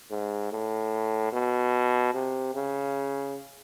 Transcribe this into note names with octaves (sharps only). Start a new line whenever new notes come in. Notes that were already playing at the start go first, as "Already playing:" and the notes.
G#2
A2
B2
C3
C#3